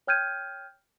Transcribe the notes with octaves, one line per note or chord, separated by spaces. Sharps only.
C#5 G5 F6 G6 G#6 D#7